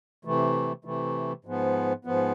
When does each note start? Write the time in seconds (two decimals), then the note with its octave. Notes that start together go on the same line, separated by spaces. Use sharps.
0.25 C3 E3 A3
0.85 C3 E3 A3
1.45 G#2 F3 B3
2.05 G#2 F3 B3